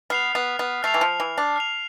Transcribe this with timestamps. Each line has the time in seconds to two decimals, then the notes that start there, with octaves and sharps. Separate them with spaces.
0.10 B3 F6 C7 F7
0.35 B3
0.59 B3
0.83 A3 F6 C7 F7
0.94 E3
1.01 F3
1.20 E3
1.38 D4
1.56 F6 C7 F7